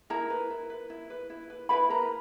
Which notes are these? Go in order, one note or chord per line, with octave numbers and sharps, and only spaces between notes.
E4 A#4 A#5
B4
E4
B4
E4
B4
E4
B4
E4 B4 B5
A#4 B4 A#5